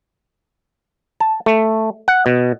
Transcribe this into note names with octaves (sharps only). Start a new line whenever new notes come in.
A5
A3
F#5
B2